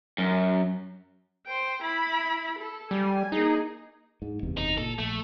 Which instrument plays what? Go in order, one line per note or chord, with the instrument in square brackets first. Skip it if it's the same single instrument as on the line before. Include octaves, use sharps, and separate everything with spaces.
[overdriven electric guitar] F#2
[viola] C5 G5
E4 B5
A4
[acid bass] G3 [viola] G#5
[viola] A#3 G#4 [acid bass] D#4
[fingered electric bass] G#2
F#1 E2 C3
[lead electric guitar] D#4
[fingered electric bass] A#2 [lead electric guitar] A4
[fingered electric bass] A#1 [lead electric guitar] A3